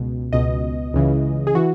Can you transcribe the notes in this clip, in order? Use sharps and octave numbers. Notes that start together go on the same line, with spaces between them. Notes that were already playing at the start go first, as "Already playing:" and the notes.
Already playing: C#2 B2
C#2 B2 D#5
C#2 C#3 E3
G#4
E3 F#4